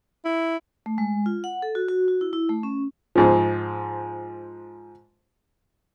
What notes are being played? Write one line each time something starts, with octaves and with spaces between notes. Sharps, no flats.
E4
A3
G#3
F4
F#5
A4
F#4
F#4
F#4
E4
E4
A3
C#4
G#2 F3